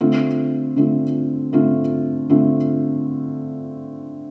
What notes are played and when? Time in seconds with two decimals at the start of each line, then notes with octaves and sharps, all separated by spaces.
0.01 D3 A3 C4 F4
0.76 D3 A3 C4 F4
1.53 D3 A3 C4 F4
2.30 D3 A3 C4 F4